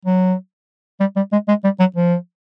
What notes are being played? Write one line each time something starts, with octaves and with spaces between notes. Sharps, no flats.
F#3
G3
G3
G#3
G#3
G3
F#3
F3